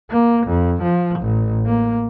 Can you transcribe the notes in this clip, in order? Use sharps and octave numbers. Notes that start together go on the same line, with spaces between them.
A#3
F2
F3
A1
A#3